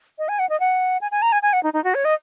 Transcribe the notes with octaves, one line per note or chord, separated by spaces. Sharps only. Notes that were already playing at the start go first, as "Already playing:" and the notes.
D#5
G#5
F#5
D#5
F#5
G#5
G#5
A#5
G#5
G#5
F#5
D#4
D#4
F#4
C#5
D#5